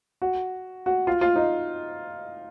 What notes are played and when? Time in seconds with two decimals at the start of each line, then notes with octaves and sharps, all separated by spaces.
0.22 F#4
0.86 F#4
1.07 F4
1.21 F4
1.36 D#4